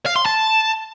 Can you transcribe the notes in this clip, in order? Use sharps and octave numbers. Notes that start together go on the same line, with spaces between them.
F5
C6
A5